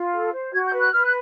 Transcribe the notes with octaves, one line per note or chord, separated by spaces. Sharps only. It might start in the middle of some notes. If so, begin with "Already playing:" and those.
Already playing: F4
A4
C5
F#4 G#6
G6
B4
F#6
B4 F6
F#6